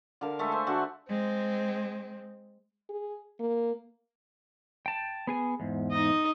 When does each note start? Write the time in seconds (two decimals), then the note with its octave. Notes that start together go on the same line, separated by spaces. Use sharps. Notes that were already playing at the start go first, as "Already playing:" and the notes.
0.21 D3 A#4 F5
0.39 G#3 A3 A4 E5
0.52 C5
0.67 D3 A3 F#4 C6
1.09 G#3 C4
2.89 G#4
3.40 A#3
4.86 G5 A5
5.27 B3 G#4 G#5
5.60 E2 G#2
5.91 D#4 D#5